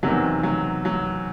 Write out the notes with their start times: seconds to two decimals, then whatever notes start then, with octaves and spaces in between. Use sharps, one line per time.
0.03 E2 C3 D#3 F#3
0.43 F#3
0.85 F#3